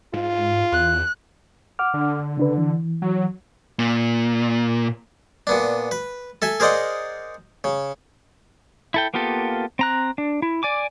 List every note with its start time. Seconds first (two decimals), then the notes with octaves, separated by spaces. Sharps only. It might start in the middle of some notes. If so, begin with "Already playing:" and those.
0.14 G#2 F4
0.72 E2 F#6
1.79 F#5 D6 F6
1.94 D3
2.37 C#3 D4 B4
2.58 E3
3.02 F#3
3.79 A#2
5.47 A#2 B3 D4
5.91 B4
6.42 A4 E5 G#5
6.60 G#4 A#4 C5 D5 D#5 F#5
7.64 C#3
8.94 E4 A4 G5
9.14 A#3 B3 F4 G4 A4
9.79 C4 A#5 F#6
10.18 D4
10.42 E4
10.63 D5 G#5 D6